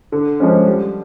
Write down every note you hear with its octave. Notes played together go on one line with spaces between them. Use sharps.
D3
F3 G#3 C#4
G3